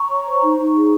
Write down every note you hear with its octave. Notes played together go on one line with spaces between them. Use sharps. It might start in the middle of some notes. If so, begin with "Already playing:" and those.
Already playing: A#5 C#6
C#5
C5
D#4
D#4
G#4